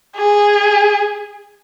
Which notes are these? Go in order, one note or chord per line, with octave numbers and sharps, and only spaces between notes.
G#4